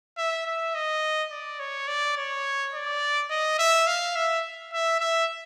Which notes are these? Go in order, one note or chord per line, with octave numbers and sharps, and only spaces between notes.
E5
E5
D#5
D5
C#5
D5
C#5
D5
D#5
E5
F5
E5
E5
E5